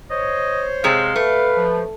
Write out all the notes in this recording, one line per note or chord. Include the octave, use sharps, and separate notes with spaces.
C5 C#5 D#5
C3 G#3 F5
A3 B4
F3